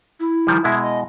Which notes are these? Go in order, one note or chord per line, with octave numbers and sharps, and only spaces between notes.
E4
D#3 F3 G3
B2 G#3 E4 E5
D#5